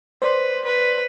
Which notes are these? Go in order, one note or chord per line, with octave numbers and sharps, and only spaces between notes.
B4 C5 D5 C6
B4